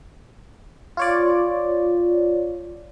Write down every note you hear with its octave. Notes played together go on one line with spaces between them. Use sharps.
F4 C#5 D5